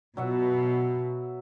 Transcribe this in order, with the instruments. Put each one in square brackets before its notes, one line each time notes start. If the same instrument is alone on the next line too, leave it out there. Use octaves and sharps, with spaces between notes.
[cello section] B2 [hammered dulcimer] F#3 E5 F#5